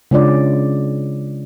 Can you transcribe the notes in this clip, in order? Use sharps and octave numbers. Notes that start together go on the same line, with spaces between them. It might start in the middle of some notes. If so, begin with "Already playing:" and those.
C#3 G#3 C#4 D4 F4 D5